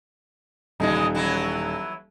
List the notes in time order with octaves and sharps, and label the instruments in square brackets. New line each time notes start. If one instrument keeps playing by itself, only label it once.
[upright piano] D#1 D#4 [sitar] C#3 E3 G#3
[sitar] E3 F#3 E4